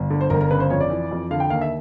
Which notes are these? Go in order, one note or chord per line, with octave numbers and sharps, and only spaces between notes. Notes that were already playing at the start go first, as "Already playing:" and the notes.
Already playing: G1
D3
C5
G1 A#4
A#4
C#3 B4
C5
F2 C#5
D5
E3
F2
D3 F5
G5
D#2 F5
E5